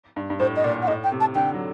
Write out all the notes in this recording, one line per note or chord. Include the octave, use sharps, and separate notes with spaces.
G2
G2
A2 C5
D#5
A#2 D5
F#5
A2 D#5
G5
C3
A5
D3 G5
F#3